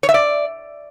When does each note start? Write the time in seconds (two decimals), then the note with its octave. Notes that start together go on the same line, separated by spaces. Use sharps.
0.03 C#5
0.09 E5
0.14 D5